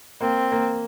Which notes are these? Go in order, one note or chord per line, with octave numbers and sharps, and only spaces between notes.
A#3 C4
A#3